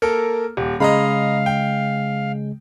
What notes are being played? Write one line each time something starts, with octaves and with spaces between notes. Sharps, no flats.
A#3 A4 A#4
D#1 G4
C#3 G#3 D#5 F5 A#5 B5
G5